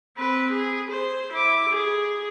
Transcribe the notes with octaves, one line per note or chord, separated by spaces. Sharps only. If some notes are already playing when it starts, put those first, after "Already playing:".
C4 B4
G#4
C5
E4 D6
G#4